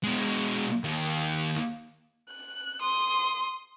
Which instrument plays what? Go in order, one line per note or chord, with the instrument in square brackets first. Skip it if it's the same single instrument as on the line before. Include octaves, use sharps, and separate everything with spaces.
[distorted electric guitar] B2 G#3
D#2
[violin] F#6
C6 D#6